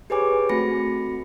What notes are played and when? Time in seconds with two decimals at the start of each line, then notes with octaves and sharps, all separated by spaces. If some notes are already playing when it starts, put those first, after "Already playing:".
0.10 G4 G#4 B4 C#5 G#5 D6
0.49 A3 C4 F#4 B5 A#6 C#7